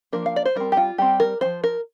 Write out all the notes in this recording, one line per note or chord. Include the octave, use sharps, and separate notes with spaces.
F3 A#3 D4 A#4
F5
D5
C5
G3 C4 A#4
G4
F4
G3 C4 G4
A#4
F3 C4 C5
A#4